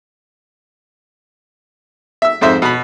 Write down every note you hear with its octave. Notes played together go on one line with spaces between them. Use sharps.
E5 E6
F2 G#2 C5 E5
B2 B5